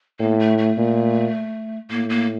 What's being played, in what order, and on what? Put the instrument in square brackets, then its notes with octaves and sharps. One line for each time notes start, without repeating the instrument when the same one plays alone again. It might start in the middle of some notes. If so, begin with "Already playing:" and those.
[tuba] A2 [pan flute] A#3
[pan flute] A3
A3
[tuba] A#2
[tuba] A2 [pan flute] A#3
[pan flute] A#3